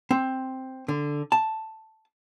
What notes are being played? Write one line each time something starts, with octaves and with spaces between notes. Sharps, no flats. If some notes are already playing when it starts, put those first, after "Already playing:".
C4
D3
A5